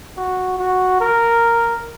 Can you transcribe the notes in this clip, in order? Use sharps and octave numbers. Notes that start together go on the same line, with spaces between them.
F#4
F#4
A#4